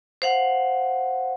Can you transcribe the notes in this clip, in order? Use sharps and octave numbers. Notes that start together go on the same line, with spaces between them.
C5 F5 F#5